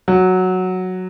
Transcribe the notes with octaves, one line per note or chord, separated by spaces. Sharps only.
F#3